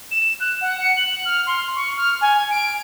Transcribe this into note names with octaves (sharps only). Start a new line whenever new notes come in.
E7
F#6
F#5
C#7
F#7
F6
C6
C#6
F6
G#5
D7